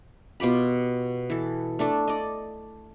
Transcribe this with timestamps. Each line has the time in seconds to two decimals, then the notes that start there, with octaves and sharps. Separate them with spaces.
0.40 B2 F4 G4 B5
1.30 E3 A4
1.79 A3 D4 A4
2.08 D5 D#5